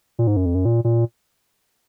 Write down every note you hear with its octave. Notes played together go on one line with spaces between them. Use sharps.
A#2
G#2
F#2
F2
F#2
A#2
A#2